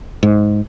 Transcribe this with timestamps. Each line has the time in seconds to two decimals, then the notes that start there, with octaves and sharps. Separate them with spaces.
0.23 G#2